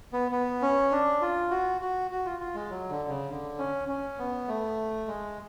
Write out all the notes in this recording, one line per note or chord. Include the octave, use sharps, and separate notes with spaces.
B3
B3
C#4
D4
F4
F#4
F#4
F#4
F4
F4
G#3
F#3
D3
C#3
D3
C#4
C#4
B3
A3
G#3